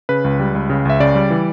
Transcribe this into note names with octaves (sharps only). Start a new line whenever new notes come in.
C#3 B4
C#2
G3
C#2
C#3
C#2 E5
C#3 D5
G3
E3